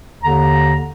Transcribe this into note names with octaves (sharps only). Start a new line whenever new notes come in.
D#2 D3 A#5